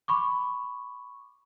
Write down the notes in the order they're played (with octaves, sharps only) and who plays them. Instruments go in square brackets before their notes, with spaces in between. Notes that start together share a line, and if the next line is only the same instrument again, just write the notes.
[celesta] B5 C#6 D6